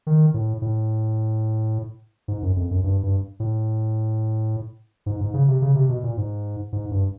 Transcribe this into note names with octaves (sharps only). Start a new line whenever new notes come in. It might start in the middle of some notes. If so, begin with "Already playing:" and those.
D#3
A2
A2
G#2
F#2
F2
F#2
G2
G2
A2
G#2
G#2
C#3
C3
C#3
C3
B2
A#2
G#2
G#2
G2